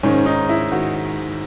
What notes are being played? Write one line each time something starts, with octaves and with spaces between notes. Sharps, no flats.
G#2 D#3 C#4
D#4
E4
D#3 F#4